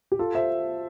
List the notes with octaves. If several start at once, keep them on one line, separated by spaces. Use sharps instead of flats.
G4
F4 A4
C5 E5